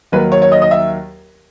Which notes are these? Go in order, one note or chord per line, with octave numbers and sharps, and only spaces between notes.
D#2 D#3 F#3 B4
C#5
C#5
D#5
D#5
E5